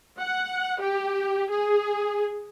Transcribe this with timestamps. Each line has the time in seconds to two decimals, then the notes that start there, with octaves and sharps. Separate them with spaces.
0.19 F#5
0.81 G4
1.50 G#4